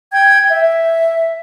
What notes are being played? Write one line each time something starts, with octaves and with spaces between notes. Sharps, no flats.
G5 G#6
E5